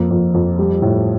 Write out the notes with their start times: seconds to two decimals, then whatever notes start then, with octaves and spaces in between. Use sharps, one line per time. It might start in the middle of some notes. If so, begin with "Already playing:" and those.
Already playing: F2 A#3
0.10 F2
0.34 F2
0.59 G3
0.82 A2